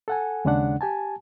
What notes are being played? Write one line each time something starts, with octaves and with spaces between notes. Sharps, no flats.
A4 F#5 G#5
D#2 C#3 G#3 C#4 D4 F#5
G4 G#5 A5